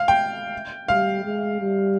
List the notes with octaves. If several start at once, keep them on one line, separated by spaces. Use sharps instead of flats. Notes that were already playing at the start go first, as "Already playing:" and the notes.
Already playing: F5
G5
G3 F5
G#3
G3